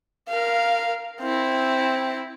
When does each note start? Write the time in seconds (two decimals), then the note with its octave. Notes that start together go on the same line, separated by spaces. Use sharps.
0.28 A#4 F5
1.21 C4 E4